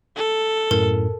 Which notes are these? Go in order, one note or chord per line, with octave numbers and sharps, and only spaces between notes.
A4
F#2 A2 A#4